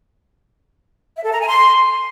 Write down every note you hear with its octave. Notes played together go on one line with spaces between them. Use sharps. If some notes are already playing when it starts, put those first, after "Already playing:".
E5
A4
A#5
G#5
C6